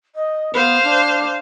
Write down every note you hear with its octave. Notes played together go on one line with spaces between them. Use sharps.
D#5
B3 C5 F5
D4